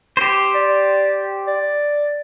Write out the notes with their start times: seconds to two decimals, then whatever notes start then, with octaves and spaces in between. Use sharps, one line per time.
0.17 G4 C5
0.54 D5
1.47 D5